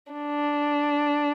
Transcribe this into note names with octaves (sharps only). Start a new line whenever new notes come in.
D4